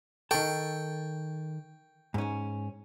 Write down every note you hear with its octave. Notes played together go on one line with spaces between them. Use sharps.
D#3 A4 G5 C#6
G#2 C#4